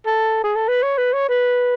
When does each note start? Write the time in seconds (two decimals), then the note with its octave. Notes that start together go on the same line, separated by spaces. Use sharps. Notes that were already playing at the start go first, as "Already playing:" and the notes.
0.06 A4
0.44 G#4
0.56 A4
0.68 B4
0.83 C#5
0.98 B4
1.13 C#5
1.29 B4